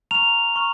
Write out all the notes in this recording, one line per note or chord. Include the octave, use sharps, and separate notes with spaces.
A#5 C#6 F6 F7
A#5 C#6 F6